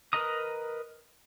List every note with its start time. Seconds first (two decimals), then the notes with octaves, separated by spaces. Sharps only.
0.13 A#4 B4 D#5 A#5 D#6